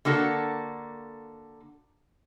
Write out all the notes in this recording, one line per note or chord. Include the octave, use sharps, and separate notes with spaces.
D3 A#3 F#4 A4